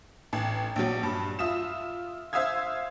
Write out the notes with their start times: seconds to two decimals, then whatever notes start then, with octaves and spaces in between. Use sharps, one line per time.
0.33 A1
0.76 A#1 F#3
1.03 G2
1.39 F4 E5 D#6 E7
2.33 C5 E5 F5 D#6 E6 G#6